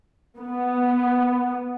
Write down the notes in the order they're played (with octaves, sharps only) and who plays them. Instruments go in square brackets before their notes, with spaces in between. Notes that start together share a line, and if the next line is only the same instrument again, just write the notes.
[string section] B3